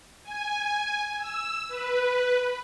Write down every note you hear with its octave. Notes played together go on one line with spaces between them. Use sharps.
G#5
E6
B4